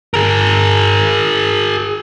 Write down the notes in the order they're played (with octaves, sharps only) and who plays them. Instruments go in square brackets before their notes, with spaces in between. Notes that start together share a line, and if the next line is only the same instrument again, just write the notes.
[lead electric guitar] G#4 A#4